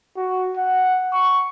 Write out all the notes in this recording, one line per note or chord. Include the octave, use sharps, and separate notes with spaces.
F#4
F#5
C#6